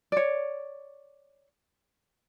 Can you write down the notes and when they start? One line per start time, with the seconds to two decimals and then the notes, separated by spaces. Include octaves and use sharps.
0.12 C#5 D5